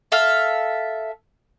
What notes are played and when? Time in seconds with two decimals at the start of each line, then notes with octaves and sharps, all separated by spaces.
0.12 A4 E5 F5